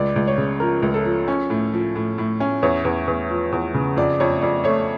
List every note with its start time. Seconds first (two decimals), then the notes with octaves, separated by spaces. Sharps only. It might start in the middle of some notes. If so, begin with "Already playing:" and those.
Already playing: C#2 D5
0.16 C#2
0.28 C#5
0.38 C#3
0.60 F3 A#4
0.82 C#2
0.94 A4
1.05 F3
1.28 C#4
1.50 A2
1.73 F3
1.96 A2
2.18 A2
2.40 C#4
2.63 E2 C#5
2.85 E2
3.07 E2
3.30 F3
3.52 E2
3.74 C#3
3.97 F2 D5
4.20 F2 C#5
4.42 F2 D5
4.64 A3 C#5